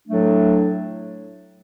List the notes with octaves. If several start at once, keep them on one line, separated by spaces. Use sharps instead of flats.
A2 F#3 A3 D4